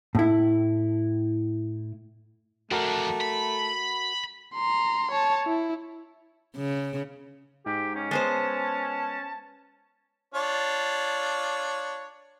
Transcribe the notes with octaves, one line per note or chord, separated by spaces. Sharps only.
A2 E4
F2 A3 D4 F#4 A#4
B5
A#5 C6
C#5 A5
E4
C#3
G#2 G4
C#4
G#3 B3 C5 A5
D4 F4 C#5